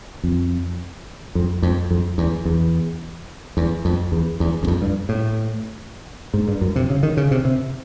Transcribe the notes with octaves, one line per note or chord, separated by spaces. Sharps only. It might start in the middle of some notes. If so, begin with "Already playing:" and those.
F2
F2
F2
F2
E2
E2
E2
F2
E2
E2
E2
F2
G2
A2
G#2
G2
F#2
C3
C#3
D#3
C#3
C3
C3